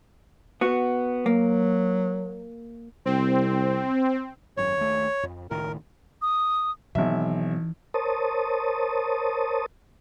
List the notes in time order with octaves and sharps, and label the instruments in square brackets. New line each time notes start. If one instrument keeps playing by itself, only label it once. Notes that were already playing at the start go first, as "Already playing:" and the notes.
[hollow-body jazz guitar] B3 F#4
[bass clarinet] F#3 [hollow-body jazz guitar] A#3
[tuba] C2 [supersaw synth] C4
[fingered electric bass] G#1 F#2 [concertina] C#5
[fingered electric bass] D#2 A3
F2
[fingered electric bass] C#2 A2 D#3 [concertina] A#4
[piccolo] D#6
[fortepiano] G#1 E5 [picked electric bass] B2 F#3 B3 [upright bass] E3
[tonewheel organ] A#4 C5 C#5 A5 D#6